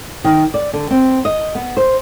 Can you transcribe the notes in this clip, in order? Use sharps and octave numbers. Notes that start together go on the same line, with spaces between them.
D#3
D5
D3
C4
D#5
B3
C5